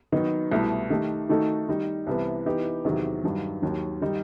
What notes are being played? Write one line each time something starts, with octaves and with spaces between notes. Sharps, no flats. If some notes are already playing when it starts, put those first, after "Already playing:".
D#3 F#3 B3 D#4
C2 B2 A3 E4
D#3 A3 D#4 G4
D#3 A3 D#4 F#4 A4
D#3 G3 D#4
C2 C3 E3 B3
E3 B3 D#4 G4
E2 C3 D#3 F#3
G2 D#3 F#3
D#2 D#3 F#3
D#3 G3 D#4